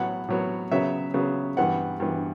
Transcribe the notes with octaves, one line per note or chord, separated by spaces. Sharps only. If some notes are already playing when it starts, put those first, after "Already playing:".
Already playing: A2 F#3 B3 F#5
A2 F#3 B3
C#3 F#3 B3 E5
C#3 F#3 B3
G2 E3 B3 F#5
G2 E3 B3